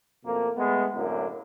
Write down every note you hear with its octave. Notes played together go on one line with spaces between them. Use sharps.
F2 B2 A3 A#3
G#3 A3 B3
F#2 A2 D3 F#3 A#3